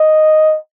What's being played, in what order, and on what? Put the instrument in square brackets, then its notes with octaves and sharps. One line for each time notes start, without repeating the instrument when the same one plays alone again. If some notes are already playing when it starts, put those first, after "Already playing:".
Already playing: [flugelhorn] D#5